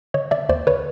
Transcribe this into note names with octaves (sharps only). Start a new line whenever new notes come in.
D3 C#5 D#5
D3 D5 E5
D#2 C5 D5
D3 B4 C#5